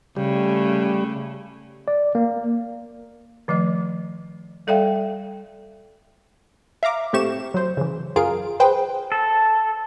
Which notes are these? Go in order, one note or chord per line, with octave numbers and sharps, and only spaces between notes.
C#3 G3 A3
D5
A#3
D#3 F3 A3 D#5
G3 A4 D5 E5 F5 G5
E5 F5 A#5 D6
A2 A3 C4 G4 C#6 E7
F#3 C5
C#3 E3
F#2 F4 G#4 A#4 F5 D7
G#4 B4 C5 G5
A4